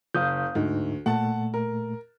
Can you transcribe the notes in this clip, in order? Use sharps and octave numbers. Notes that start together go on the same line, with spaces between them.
F#1 F5 D#6 G6
D2 G#2 D#4
A#2 A3 F#5 A5
A#4